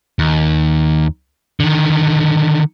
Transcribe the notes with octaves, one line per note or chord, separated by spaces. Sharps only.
D#2
D3 D#3